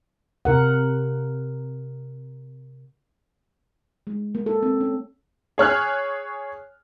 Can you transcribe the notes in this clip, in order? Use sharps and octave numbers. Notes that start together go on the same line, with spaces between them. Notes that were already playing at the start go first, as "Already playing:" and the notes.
C3 A#4 F#5
G#3
A#3
A4
C4
C#4
G#4 C#5 F6 F#6